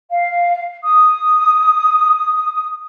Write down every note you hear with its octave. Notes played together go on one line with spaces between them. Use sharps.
F5
D#6